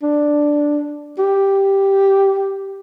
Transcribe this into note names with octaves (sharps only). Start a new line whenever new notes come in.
D4
G4